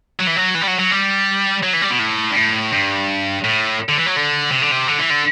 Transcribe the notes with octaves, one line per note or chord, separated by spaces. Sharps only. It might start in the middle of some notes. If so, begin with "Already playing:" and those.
F#3
E3
F#3
E3
G3
F#3
F#3
G3
F#3
E3
G3
B2
A2
G2
A2
G2
A2
D3
E3
F#3
D3
C3
D3
C3
D3
E3
D3